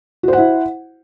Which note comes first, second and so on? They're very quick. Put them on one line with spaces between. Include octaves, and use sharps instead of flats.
F#4 C5 F#5 E4